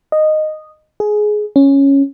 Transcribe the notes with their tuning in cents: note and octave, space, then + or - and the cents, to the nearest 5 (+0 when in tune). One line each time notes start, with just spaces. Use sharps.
D#5 -10
G#4 +15
C#4 -5